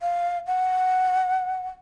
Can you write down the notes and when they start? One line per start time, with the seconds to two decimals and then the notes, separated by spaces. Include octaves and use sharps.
0.01 F5
0.47 F#5